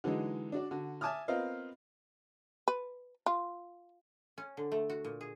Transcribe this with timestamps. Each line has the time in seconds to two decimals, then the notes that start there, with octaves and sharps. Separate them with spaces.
0.04 D3 E3 F#3 G#3 D#4
0.52 D4 F#4 D5
0.71 D3 F#4
1.01 E5 G#5 A5 D6 D#6 F6
1.28 B3 C4 F4 A#4 D#5 F5
2.68 B4
3.26 F4
4.38 C#4
4.57 D3
4.72 A3
4.90 F#4
5.04 A#2
5.21 G#4